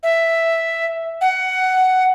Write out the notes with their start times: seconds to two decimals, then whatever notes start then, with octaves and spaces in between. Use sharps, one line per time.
0.03 E5
1.21 F#5